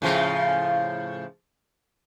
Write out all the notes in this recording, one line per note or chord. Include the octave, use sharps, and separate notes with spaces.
A2 C#3 F3